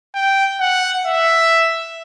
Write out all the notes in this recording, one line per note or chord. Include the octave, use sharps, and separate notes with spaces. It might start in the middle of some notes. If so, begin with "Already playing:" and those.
G5
F#5
E5